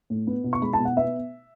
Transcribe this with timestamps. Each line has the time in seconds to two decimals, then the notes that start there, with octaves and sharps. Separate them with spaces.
0.10 A2
0.27 B3
0.44 B2
0.53 C#6
0.62 G#3 B5
0.73 A5
0.79 B2
0.85 F#5
0.96 B3 E5